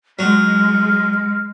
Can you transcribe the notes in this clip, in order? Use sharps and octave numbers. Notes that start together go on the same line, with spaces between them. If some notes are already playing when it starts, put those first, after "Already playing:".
F#3 G#3 F6